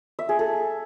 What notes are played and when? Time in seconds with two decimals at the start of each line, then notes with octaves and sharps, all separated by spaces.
0.19 E5
0.29 G#4
0.39 A4